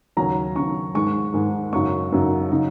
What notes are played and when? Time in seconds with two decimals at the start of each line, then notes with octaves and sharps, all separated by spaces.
0.17 D#2 C#3 F#3 C#4 A#5
0.55 D#2 C#3 F#3 C#4 C#6
0.95 G#2 D#3 G#3 C#6
1.33 G#2 D#3 G#3
1.73 F#2 C#3 F#3 D#4 C#6
2.12 F#2 C#3 F#3 D#4
2.52 C#3 F#3 D#4